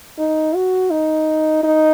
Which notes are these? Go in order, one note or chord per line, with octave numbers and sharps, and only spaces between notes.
D#4
F#4
D#4
D#4